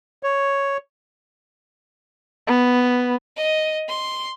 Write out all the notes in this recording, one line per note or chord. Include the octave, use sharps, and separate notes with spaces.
C#5
B3
D#5
C6